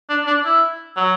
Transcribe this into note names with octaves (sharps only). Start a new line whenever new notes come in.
D4
D4
E4
F#3